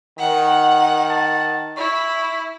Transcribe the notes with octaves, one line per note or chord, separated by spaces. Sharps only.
D#3 F#5
A5
E4 C#6